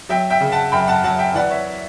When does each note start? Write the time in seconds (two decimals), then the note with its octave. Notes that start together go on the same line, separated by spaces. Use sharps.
0.09 F#3 E5 G5
0.30 E5 G5
0.40 C#3
0.52 F#5 A5
0.72 F#2 G5 B5
0.87 F#5 A5
1.04 F#3 F#5 A5
1.19 E5 G5
1.34 E3 D5 F#5
1.50 C#5 E5